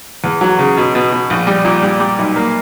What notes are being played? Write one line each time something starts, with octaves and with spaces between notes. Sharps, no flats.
E2
F#3
C#3
B2
B2
B2
A#1
G3
A#2
G3
G3
B1
A#3